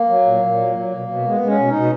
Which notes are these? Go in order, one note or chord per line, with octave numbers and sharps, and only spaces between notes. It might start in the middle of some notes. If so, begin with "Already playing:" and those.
Already playing: A#3
F#3
A#2
A#2
F#3
F#3
B2
B2
G#3 B3
G#3
C#4
B2
B2 D#4